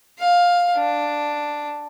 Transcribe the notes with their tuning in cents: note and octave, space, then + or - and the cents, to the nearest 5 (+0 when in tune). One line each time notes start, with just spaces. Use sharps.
F5 +10
D4 +5